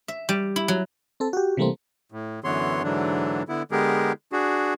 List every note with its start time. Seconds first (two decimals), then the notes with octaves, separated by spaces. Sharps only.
0.08 E5
0.29 G3
0.56 E4
0.68 F#3
1.20 C4 A4
1.33 F#4 G4
1.57 C3 E3 G3 A3 A#3 C4
2.12 A2
2.44 F#2 D3 E3 B3 C#5 C6
2.83 G#2 D3 E3 F#3 D4
3.49 D3 B3 E4
3.71 D3 G#3 B3 G4 G#4 A#4
4.32 D4 F#4 G#4